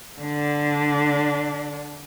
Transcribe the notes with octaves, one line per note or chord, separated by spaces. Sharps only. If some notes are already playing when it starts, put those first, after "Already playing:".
D3 D4